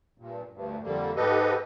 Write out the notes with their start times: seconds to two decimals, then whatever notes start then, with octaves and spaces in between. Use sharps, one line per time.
0.18 G2 A#2
0.53 D2 G2
0.82 F2 D3 G3 A#3
1.16 G#2 G4 A4 B4 D#5